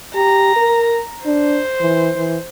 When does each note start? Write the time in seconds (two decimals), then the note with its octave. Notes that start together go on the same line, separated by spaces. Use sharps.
0.15 G4 A#5
0.56 A#4
1.26 D4 C5
1.81 E3
2.15 E3